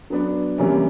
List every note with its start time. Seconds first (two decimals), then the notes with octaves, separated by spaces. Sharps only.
0.10 F#3 B3 D4
0.58 C3 E3 G3 A#3 C#4